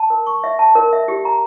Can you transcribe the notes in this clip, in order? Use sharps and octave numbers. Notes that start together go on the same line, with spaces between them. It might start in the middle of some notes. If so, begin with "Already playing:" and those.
Already playing: A5
A#4
C#6
E5
A5
A#4
E5
G4
A#5